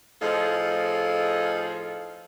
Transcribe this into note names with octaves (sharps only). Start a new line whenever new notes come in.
A2 F3 D#4 G#4 A4 F5